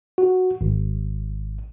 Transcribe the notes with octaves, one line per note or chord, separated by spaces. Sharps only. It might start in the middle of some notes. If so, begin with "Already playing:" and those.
F#4
G#1